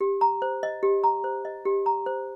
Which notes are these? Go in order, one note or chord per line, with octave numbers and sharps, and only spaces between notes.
G4
A#5
C5
D#5
G4
A#5
C5
D#5
G4
A#5
C5